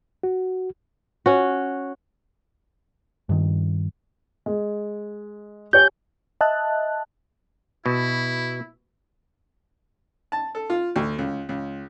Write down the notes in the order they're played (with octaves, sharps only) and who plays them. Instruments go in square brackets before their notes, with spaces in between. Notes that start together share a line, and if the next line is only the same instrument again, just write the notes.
[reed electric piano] F#4
[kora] C#4 F#4
[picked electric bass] G2 D#3
[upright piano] G#3
[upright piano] G4 C#5 G#5 [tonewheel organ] G6
[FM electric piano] D#5 E5 A5 F#6
[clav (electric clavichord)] B2 [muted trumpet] E4
[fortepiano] A5
A4
F4
D2
C#2
C#2